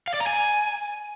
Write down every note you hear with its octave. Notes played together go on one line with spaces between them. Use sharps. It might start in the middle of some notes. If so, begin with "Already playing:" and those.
F5
D5
A#5
G#5